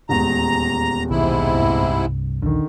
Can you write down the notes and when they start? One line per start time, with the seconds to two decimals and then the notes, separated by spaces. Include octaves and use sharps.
0.09 D#1 E2 G#3 A#5
1.11 B1 G#2 C3 D#3 E4
1.53 C2 G2
2.42 A#1 D#2 D3 D#3